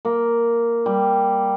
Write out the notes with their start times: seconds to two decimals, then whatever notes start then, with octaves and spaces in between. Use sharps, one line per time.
0.05 A#3
0.86 G3